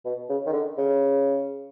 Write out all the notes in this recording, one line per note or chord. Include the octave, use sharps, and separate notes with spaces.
B2
C#3
D#3
D3
C#3